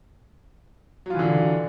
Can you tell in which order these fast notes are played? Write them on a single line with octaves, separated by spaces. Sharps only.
F#3 F4 E3 D3